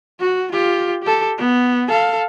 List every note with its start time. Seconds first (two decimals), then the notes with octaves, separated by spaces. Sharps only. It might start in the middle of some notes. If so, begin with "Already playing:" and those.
0.19 F#4
0.51 F4 G4
1.03 G4 A4
1.38 B3
1.88 A4 F5